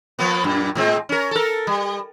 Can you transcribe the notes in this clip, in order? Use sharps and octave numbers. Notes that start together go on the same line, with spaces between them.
F3 A#3 B3
F#2 A#2
A2 G#3 C4
C#4 A#4
A4 A#4
G3